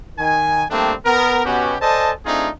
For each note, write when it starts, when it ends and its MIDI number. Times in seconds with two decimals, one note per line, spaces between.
0.19 0.64 51
0.19 0.64 80
0.70 0.93 55
0.70 0.93 57
0.70 0.93 58
0.70 0.93 60
0.70 0.93 62
1.06 1.45 59
1.06 1.45 70
1.45 1.76 47
1.45 1.76 59
1.45 1.76 61
1.45 1.76 66
1.45 1.76 67
1.81 2.12 69
1.81 2.12 72
1.81 2.12 74
1.81 2.12 75
1.81 2.12 80
1.81 2.12 81
2.26 2.49 57
2.26 2.49 60
2.26 2.49 62
2.26 2.49 63
2.26 2.49 65
2.26 2.49 68